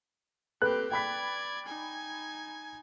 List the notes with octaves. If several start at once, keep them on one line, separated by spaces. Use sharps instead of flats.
C4 G4 A4 B4 F#6
D5 G5 B5 G#6 B6
D#4 G#5